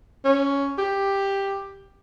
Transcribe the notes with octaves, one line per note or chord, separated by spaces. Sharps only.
C#4
G4